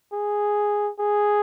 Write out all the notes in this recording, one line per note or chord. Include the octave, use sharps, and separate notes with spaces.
G#4
G#4